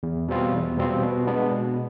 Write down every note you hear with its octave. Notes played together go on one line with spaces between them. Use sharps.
E2
B2 G3 C4 F4
E2
B2 G3 C4 F4
B2
G#3 B3 D4
B2